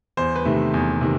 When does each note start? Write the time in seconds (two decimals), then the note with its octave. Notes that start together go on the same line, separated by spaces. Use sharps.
0.17 E2 C5
0.36 B4
0.45 C3 D#3 A3
0.74 E2
1.01 C3 D#3